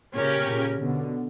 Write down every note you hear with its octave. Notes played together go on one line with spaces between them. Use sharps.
A#2 C#3 C#4 G4 A#4
A#2 C#3
B2 D3